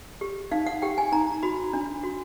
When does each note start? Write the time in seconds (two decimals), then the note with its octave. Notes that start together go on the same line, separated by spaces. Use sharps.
0.21 G4
0.51 D#4 F5
0.66 F#5
0.82 G4 G5
0.98 G#5
1.12 D#4 A#5
1.43 F#4 B5
1.73 D4
2.03 F#4